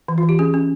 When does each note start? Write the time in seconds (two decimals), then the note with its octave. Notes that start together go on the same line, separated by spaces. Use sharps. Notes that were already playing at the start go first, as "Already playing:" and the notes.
0.08 E3
0.18 F4
0.23 E3
0.29 G4
0.39 C#4 G#4
0.54 C#4